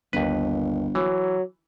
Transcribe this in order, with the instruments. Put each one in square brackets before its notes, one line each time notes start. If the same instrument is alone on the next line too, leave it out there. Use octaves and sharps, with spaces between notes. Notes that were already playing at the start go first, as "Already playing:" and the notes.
[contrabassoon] G1 [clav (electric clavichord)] D#2 B4
[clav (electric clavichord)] E3 [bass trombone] F#3